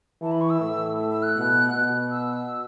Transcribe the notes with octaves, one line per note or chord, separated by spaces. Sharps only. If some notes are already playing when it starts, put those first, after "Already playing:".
E3 A5
B5
C#6
E6
A2
E6
E6
F#6
B2
B2
E6